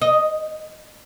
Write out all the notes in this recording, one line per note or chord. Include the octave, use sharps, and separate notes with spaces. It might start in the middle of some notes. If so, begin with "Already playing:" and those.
D#5